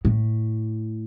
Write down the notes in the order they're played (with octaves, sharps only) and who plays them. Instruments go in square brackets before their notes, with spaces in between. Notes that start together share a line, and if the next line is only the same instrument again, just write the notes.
[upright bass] A2